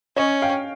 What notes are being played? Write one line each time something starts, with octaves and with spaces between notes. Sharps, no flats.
C#4 C#5 D#5
F5 G5